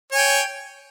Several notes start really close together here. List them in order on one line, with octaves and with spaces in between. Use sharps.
C#5 G#5 G5